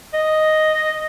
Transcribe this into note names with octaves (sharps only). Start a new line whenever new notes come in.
D#5